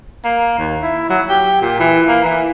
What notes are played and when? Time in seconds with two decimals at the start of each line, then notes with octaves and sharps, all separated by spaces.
0.25 A#3
0.58 D#2
0.82 E4
1.10 F#3
1.29 G4
1.62 A#2
1.80 E3
2.08 A#3
2.24 E3